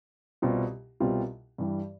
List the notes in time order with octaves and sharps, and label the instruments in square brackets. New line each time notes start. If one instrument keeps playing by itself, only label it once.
[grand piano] C2 B2 G3 C4 F4
C2 B2 G3 C4 F4
G2 E3 G3